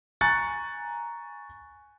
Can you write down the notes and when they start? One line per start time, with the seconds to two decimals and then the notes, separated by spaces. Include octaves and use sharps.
0.21 G#5 A#5 C#6 F#6 A6 C#7